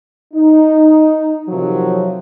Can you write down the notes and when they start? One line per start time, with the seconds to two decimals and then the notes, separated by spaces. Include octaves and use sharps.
0.34 D#4
1.49 C3 D#3 F3 F#3